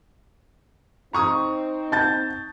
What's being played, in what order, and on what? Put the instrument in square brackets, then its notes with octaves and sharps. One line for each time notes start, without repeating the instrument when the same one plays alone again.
[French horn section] C4 D#4 [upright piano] A#5 C#6 D#6
[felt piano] A5 G6 A6